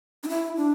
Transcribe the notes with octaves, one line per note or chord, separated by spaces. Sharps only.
D4
E4
D4